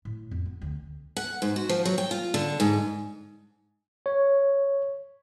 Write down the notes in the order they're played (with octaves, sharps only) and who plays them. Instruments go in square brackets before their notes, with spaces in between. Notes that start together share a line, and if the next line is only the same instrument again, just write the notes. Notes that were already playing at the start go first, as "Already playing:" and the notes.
[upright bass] A2
F2
B3
D2
[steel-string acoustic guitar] F#5
G#2
F#4
F3
F#3
G5
F4
D3
G#2
[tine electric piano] C#5